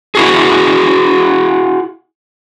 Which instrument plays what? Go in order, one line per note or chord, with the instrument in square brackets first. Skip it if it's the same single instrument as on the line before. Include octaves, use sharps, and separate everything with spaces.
[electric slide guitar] E4 F#4 G#4